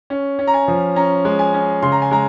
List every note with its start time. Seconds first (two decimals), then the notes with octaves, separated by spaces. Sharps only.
0.10 C#4
0.39 C#4
0.47 A#5
0.54 G#5
0.68 F3
0.96 C#4 A#5
1.25 G#3
1.39 G#5
1.54 C#4
1.82 C#3 C6
1.92 A#5
2.02 G#5
2.11 G#3 A#5